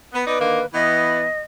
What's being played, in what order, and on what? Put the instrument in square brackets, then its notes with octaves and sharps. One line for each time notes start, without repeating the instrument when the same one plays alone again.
[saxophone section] B3
[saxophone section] B3 D#4 D5 [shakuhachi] B4
[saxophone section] D3 D#3 A#3
[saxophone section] E3 B3 [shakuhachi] D#5